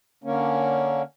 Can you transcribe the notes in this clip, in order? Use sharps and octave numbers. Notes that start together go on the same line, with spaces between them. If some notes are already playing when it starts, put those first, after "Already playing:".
D3 A#3 C#4